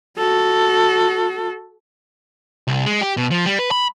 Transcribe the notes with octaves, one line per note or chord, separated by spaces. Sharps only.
F#4 A4
C2
G#3
G4
B2
F3
G3
B4
B5